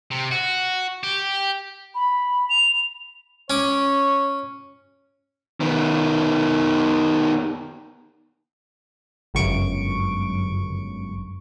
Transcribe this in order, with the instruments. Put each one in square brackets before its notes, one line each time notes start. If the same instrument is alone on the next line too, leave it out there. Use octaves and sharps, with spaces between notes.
[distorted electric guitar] C3
F#4
G4
[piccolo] B5
F7
[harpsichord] C#4 D6 [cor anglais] C#5
[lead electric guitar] D#3 B3
[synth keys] G1 C#2 F#2 C#6 D7